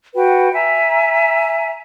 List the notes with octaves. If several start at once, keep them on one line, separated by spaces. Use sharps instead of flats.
F#4 B4 G5
E5 G#5 A#5